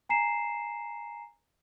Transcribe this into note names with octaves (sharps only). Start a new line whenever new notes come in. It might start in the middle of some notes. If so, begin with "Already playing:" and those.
G#5 A#5 C7 E7